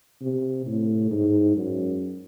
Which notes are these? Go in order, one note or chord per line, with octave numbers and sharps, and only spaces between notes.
C3
A2
G#2
F#2